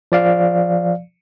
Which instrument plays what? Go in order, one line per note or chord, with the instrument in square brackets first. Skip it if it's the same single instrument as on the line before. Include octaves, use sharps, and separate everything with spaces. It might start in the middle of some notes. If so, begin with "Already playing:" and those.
[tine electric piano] F3 D5 F5